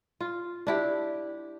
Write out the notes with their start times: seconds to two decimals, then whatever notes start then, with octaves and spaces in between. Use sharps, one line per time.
0.21 F4
0.67 D4 E4 G4